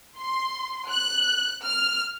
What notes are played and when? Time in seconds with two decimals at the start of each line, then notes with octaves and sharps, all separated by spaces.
0.17 C6
0.90 F#6
1.64 F6